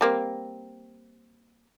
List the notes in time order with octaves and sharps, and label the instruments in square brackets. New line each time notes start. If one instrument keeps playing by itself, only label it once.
[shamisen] G3 A#3 C4